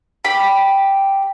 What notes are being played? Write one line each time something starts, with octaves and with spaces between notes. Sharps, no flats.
G4 B5